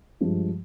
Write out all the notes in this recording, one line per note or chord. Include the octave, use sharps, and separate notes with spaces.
G2 F3 G#3